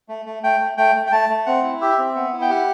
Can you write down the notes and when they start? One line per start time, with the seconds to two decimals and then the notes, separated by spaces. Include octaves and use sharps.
0.09 A3
0.26 A3
0.43 A3 G5
0.60 A3
0.77 A3 G5
0.95 A3
1.06 G5
1.12 A3 A5
1.29 A3
1.46 C4 F#5
1.63 E4
1.81 G4 E5
1.98 C4
2.15 B3
2.33 E4
2.42 G5
2.49 G4 F#5